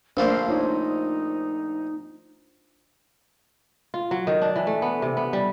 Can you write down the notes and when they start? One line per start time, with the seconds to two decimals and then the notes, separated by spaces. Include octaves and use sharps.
0.17 A#1 A3 A#3 D4 C5 F5
0.48 D#4 F4 C#5
3.94 F4
4.11 F#3
4.27 D#3
4.42 D4
4.56 E3
4.67 A3
4.82 B3
5.02 C3
5.17 B3
5.33 G3